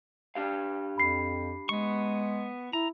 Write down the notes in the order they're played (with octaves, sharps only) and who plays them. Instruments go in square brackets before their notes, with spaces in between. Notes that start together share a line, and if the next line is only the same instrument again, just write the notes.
[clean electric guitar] D4 G4 F5
[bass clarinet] F2 [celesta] B5 C7
[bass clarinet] G#3 [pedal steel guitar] B3 C#6
[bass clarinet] E4 [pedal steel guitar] A#5